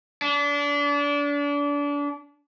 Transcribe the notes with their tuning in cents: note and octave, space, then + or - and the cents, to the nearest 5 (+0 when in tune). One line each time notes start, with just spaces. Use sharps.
D4 -30